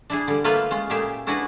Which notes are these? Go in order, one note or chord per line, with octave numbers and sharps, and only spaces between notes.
D4 E4 G#4
D3 G3
A3 A#3 F4 B4 F5
G#3 C#4 F4
A#2 A3 G4 G#4 E5
C#4 D4 E4 F#4 G#4 B4